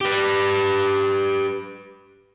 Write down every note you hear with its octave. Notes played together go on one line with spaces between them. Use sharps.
G4 B4